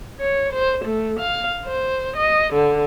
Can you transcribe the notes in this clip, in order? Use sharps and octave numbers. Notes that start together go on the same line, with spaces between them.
C#5
C5
A3
F5
C5
D#5
D3